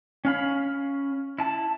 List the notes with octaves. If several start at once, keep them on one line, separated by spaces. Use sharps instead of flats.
C#4 F5 B5
E4 A5